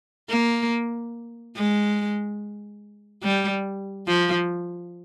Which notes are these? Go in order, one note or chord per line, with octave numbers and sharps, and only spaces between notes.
A#3
G#3
G3
F3